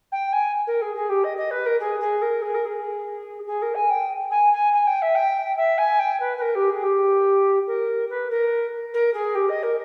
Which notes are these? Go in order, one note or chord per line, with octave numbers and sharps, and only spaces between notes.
G5
G#5
A#4
G#4
G#4
G4
D#5
D#5
B4
A#4
G#4
G#4
A#4
G#4
A#4
G#4
G#4
A#4
G#5
G5
G#5
G#5
G#5
G5
E5
G5
E5
G#5
G5
B4
B4
A#4
G4
G#4
G4
A#4
B4
A#4
A#4
G#4
G4
D#5
A#4